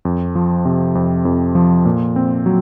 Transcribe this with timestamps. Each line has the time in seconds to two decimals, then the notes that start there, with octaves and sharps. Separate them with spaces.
0.05 F2
0.35 F3
0.65 C3
0.95 F2
1.25 F2
1.55 F3
1.85 A#2
2.16 C4
2.46 F#3